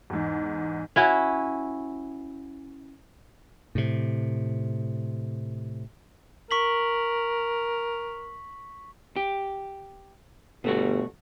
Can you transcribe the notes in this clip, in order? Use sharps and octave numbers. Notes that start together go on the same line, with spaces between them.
E2 G#2
C#4 E4 F#4
A2 C3
A#4 C#6 B6 F#7
G4
G1 B2 A3 F#4